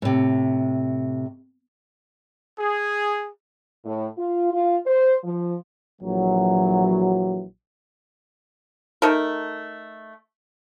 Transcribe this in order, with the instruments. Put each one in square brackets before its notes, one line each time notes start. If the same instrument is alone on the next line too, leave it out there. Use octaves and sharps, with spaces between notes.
[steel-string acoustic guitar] A2 C3
[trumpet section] G#4
[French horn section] A2
F4
F4
C5
F3
[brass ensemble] A#1 E3 F#3
[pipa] A3 D#4 A4 A#4